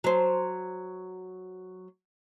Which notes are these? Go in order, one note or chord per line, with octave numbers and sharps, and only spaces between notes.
F#3 C5